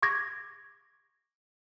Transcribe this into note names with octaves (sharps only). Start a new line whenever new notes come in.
C#6 D6 G#6 A#6